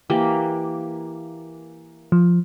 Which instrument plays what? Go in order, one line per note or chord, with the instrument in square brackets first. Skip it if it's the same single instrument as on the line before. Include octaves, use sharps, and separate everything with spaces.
[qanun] E3 A#3 G4
[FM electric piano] F3